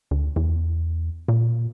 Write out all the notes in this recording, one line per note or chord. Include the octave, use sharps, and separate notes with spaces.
D2
E2
A#2